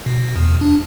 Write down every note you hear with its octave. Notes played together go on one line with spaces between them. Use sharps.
B2
E2
D4